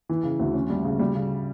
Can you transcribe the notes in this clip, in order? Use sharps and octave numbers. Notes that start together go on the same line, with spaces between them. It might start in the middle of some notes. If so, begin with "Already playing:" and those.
E3
C#3
D2
C#4
G3
C#3
G3
C#3